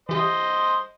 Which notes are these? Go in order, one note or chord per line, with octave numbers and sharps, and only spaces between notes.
E3 G4 C5 D#5 D#6